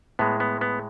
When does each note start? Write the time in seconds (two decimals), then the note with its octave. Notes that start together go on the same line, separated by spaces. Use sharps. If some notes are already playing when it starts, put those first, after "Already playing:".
0.19 A2 G#3 B3
0.40 B3
0.61 B3